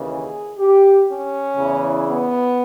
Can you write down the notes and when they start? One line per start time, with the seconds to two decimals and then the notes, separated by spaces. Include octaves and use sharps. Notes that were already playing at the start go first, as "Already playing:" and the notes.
Already playing: D#2 C#3 E3
0.09 G#4
0.58 G4
1.08 C#4
1.57 E2 C#3 E3
2.07 B3